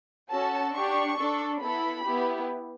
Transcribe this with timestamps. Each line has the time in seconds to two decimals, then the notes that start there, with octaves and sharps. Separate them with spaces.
0.32 C#4 F#4 A4 A5
0.75 D4 G4 C#6
1.18 D4 A4
1.62 B3 E4 A4 B5
2.06 B3 E4 G4